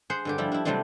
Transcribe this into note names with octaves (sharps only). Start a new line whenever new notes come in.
G#4 C5 F#5
G2 D3 G4
F3 G3 E4
D4 E4
C3 F#3 G3 A3 C4 D4